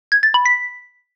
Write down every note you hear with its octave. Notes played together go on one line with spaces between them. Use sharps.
G#6
A6
B5
B6